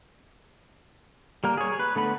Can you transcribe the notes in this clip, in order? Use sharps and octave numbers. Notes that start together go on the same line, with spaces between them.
G3 A#3 A#4
G#4 C#5
B4
D3 A3 B3 B5